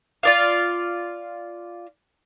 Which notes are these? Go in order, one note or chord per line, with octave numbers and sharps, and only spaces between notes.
F4 D5 F5